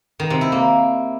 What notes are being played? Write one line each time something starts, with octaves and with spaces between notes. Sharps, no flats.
D#3
C3
E4
A#3